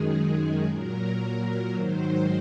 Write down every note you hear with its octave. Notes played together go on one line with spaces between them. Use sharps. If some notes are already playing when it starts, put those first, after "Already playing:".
Already playing: F#2 D#3 G#3 G#4
A#2 F#3 A#4
G#2 D#3 F#3 C5